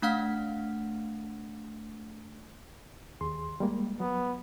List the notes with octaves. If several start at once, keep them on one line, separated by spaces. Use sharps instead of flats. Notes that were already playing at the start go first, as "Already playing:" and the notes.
A3 D4 F5 F#5 F6 B6
D#2 G#4 C6
G3 G#3 A#3
F#3 B3